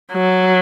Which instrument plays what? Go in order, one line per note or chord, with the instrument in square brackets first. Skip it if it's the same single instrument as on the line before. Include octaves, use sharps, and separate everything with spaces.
[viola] F#3